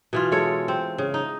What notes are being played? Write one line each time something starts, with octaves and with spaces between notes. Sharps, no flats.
B2 E3 F4
G#3 A4 C#5
C4
C#3
D#4